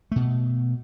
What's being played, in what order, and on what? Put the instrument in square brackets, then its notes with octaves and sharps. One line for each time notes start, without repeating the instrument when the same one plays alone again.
[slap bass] B2 A3